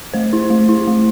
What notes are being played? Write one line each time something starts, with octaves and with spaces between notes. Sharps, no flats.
A3 C5
E4
A3
E4
A3